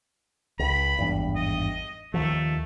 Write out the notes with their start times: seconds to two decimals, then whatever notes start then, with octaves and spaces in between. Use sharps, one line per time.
0.59 C#2 B5
0.98 G#1 E2 G2
1.36 D#5
2.14 D#2 D#3 F3 A3